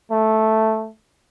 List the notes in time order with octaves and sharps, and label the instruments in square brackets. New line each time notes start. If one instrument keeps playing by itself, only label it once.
[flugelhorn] A3